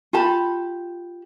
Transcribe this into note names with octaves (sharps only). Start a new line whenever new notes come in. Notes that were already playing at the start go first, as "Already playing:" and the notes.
F4 G4 A5 B5